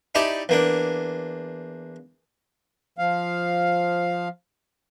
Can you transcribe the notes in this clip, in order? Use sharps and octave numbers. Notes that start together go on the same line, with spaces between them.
D#4 E4 G4 D5 A5
E2 A#3 D4
F3 F5